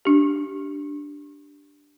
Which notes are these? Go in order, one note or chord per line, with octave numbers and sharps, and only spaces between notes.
D4 G4